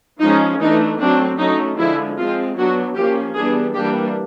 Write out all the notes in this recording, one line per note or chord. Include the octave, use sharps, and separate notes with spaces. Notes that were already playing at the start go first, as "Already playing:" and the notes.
F3 G#3 C#4 D#4
E3 A3 D4 D#4
F#3 A3 C4 D4
F#3 A3 C#4 D#4
D3 F3 G#3 E4
F3 G#3 C4 F4
F#3 B3 D4 F#4
F3 A#3 C#4 G4
E3 G3 B3 D4 G#4
E3 G3 A#3 D4 G4